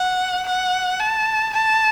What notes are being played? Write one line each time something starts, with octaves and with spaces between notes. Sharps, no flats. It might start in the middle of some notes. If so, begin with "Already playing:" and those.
Already playing: F#5
F#5
A5
A5